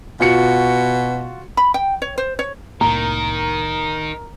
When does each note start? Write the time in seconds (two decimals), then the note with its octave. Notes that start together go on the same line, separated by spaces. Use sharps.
0.20 B2 F4 F#4 C#7
1.57 B5
1.74 G5
2.02 C#5
2.18 C5
2.39 C#5
2.81 C2 A2 D#3 A#3 A#4 A#5